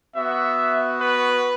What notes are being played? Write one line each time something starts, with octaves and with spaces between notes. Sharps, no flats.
B3 F#4 E5
B4